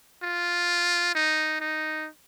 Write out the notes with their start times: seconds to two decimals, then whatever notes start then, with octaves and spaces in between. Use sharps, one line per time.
0.22 F4
1.15 D#4
1.60 D#4